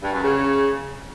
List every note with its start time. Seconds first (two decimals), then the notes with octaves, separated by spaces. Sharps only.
0.02 G2
0.12 F#2
0.23 C#3